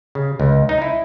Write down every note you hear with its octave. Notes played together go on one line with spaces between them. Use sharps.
C#3
C#2
D#4
E4